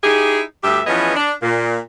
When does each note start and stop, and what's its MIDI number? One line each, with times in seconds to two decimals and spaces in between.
0.04 0.41 63
0.04 0.41 64
0.04 0.41 67
0.04 0.41 68
0.64 0.82 38
0.64 0.82 43
0.64 0.82 67
0.64 0.82 76
0.87 1.15 52
0.87 1.15 53
0.87 1.15 59
0.87 1.15 61
0.87 1.15 68
0.87 1.15 75
1.16 1.32 62
1.43 1.78 46